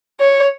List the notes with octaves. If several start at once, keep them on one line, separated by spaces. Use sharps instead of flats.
C#5